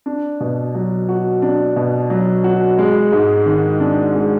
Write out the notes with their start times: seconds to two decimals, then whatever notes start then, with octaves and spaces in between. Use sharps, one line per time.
0.06 D4
0.40 B2
0.75 F#3
1.09 F#4
1.42 D4
1.76 B2
2.10 F#3
2.44 F#4
2.78 G#3
3.12 G#2
3.46 D#3
3.80 D4
4.15 G#3